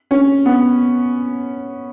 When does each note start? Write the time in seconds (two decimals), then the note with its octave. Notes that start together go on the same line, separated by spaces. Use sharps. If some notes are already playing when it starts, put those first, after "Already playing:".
0.11 C#4
0.46 B3